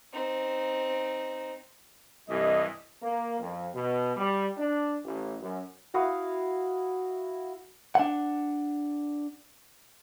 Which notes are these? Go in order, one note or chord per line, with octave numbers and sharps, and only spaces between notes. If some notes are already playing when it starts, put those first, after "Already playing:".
C4 D#4
C2 G2 E3 D#5
A#3
F2
B2
G3
D4
A1
F#2
E4 F#4 F5 D#6
D4 F#5